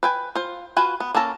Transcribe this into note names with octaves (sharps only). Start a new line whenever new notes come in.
B4 G5 G#5
F4 C5
F4 F#4 B4 G#5
B3
A#3 C#4 A4 A5 A#5